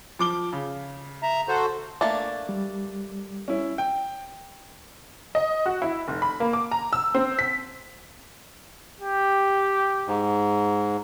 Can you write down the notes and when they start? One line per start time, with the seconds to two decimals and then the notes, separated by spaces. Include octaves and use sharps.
0.19 F3 D6 G7
0.52 C#3
1.23 E5 A#5
1.48 F#4 A4 C5
2.01 A3 A#3 D4
2.49 G3
3.48 C#4 E4
3.78 G5
5.35 D#5
5.66 F#4
5.82 E4
6.08 F1
6.22 B5
6.40 A#3
6.53 D6
6.71 A#5
6.93 E6
7.15 C4
7.39 B6
9.00 G4
10.07 G#2